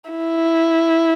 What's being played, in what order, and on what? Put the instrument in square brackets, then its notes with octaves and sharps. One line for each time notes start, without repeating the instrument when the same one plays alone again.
[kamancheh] E4